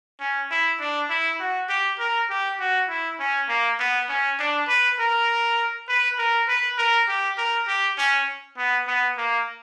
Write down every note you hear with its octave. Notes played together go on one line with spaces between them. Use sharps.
C#4
E4
D4
E4
F#4
G4
A#4
G4
F#4
E4
C#4
A#3
B3
C#4
D4
B4
A#4
B4
A#4
B4
A#4
G4
A#4
G4
C#4
B3
B3
A#3